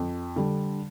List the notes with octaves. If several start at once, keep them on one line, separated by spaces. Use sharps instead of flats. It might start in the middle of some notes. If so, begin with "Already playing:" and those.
Already playing: F2
D3 G3